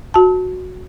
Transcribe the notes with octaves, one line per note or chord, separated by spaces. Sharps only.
F#4 A5